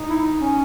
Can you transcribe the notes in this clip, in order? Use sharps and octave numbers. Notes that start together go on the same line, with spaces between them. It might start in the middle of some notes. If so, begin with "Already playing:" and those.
Already playing: D#4
E4
C#4